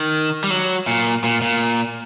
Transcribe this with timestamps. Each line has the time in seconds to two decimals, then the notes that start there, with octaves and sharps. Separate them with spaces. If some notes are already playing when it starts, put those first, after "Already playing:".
Already playing: D#3
0.44 G3
0.50 F#3
0.87 A#2
1.24 A#2
1.42 A#2